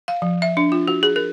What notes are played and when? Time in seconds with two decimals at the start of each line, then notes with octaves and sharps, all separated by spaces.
0.08 F5
0.22 F3
0.42 E5
0.57 D4
0.72 F4
0.88 F#4
1.03 G#4
1.16 A#4